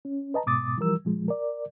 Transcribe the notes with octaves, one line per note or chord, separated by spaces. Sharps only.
C#4
B4 D#5 A5 A#5
G#2 B2 D6 D#6 A6
E3 F3 G3 A#4 E6
A#2 F3 G#3
A#4 D5